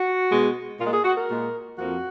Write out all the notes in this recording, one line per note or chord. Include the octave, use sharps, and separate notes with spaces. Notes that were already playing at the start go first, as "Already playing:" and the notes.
Already playing: F#4
B2 G#3
A#2 G#3 F4
G#4
F#4
A#4
A#2 G#3
F2 F3 A#3 F#4